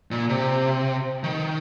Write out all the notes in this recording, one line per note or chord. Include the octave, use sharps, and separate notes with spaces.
A#2
C3
D#3